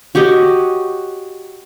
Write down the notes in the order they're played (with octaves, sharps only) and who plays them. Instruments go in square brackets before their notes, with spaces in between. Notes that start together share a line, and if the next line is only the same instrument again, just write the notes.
[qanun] F#4 G4 C#5 D#5